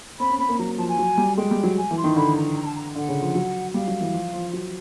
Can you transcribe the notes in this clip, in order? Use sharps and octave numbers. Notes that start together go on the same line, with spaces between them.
C4 B5
C#4
C4 B5
A#3
F#3 A#5
F3 A5
G#5
F#3
G3
G#3 G5
G3
F#3
G#5
E3
C6
D#3
D3 B5
A#5
A#5
A5
A#5
D3 F#5
C#3
F3
F#3
G3 F5
F#3
E3
F3
F3
F#3